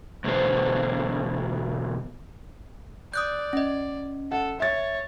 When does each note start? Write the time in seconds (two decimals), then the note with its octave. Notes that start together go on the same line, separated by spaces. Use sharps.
0.24 E2 B2 D3 B3 C5
3.14 D5 D#6 F#6 G6
3.53 C#4 D#5
4.32 A4 F#5
4.60 C#5 E5 A6